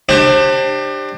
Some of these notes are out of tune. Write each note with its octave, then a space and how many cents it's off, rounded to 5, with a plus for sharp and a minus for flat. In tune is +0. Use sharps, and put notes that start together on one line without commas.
D4 +30 G4 +5 C5 +35